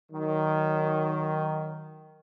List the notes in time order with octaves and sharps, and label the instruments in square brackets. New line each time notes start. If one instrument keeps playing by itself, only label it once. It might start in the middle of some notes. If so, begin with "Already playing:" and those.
[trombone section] D#3 F#3